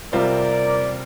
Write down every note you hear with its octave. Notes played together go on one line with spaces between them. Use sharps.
C3 G3 C4 F4 A#4 D5